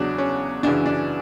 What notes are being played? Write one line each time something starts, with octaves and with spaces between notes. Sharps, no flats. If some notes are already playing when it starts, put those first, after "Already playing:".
Already playing: E2 C#3 F#3 D4
C#4
F#2 C#3 E3 D4
D4